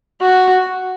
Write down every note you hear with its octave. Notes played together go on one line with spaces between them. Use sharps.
F#4